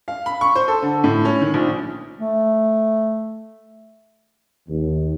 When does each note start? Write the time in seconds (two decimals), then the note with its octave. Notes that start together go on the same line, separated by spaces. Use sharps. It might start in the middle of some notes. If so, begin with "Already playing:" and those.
0.08 F5
0.26 B5
0.41 C#6
0.56 C5
0.68 A4
0.82 D3
1.04 A2
1.25 C#4
1.41 D#3
1.54 A#1
2.19 A3
4.69 D#2